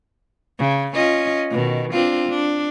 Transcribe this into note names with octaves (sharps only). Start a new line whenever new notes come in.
C#3
C#4 F4 D#5
B2 D#3
C4 D4 F4
D4